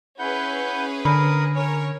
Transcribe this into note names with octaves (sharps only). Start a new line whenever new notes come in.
C#4 E4 G#4 B4 F#5 G6
D3 A#4 B5 D#6
C#4 A#4 C#5